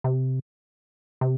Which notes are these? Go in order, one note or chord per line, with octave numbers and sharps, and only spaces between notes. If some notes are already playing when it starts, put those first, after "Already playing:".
C3
C3